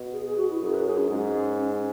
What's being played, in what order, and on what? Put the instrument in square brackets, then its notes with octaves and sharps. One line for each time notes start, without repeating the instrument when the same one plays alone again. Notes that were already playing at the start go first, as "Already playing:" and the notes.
Already playing: [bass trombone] B2
[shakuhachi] G#4
G#4
F#4
E4
[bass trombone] F#2 [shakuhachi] G#4
[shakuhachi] B4
G#4
C#4
[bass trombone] G#2 [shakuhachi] C#4